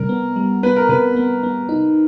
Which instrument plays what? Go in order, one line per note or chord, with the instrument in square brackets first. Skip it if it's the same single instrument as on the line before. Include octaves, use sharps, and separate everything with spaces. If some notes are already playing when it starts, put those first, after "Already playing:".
Already playing: [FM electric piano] C3 G3 [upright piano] A#4
[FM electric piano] B3
G3
[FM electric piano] B3 [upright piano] B4
[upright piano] A#4
[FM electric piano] C3 [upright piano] B4
[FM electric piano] B3
B3
D#4